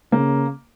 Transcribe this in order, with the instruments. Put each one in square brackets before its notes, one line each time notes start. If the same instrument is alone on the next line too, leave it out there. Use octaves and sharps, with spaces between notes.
[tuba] C#3 [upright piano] A#3